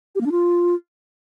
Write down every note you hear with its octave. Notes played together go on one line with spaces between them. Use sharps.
G4
A#3
D4
F4